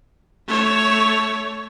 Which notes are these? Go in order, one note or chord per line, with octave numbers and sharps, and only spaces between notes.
A3 C#5